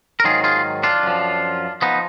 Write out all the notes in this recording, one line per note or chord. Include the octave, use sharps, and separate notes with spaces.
A#4
G#2 D#3 F#3 F4 G#4
F4 G#4
D4 F4
F#2 F3
F3 B3 D#4